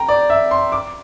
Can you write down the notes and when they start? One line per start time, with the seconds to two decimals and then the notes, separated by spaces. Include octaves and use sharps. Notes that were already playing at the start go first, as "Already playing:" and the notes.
Already playing: G5 A#5
0.09 D5
0.30 E5
0.51 C6
0.72 D6